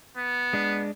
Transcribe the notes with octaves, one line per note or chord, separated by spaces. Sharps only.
B3
G#3 D4